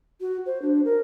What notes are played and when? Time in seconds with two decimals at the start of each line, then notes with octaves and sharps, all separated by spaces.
0.21 F#4
0.46 C5
0.62 D4
0.85 A#4